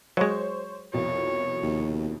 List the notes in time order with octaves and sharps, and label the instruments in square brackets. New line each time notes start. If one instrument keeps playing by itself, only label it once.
[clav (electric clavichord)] F#3 G#3 [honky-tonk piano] C5 C#5 C#6
[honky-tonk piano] C2 F2 B2 [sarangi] C#5
[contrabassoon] D#2